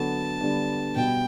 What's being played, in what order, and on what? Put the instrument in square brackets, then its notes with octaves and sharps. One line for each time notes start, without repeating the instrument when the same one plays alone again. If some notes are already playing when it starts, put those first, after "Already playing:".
Already playing: [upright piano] D3 F#3 B3 F#4 A4 [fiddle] A5
[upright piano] D3 G3 B3 D4
[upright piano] B2 G3 B3 [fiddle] G5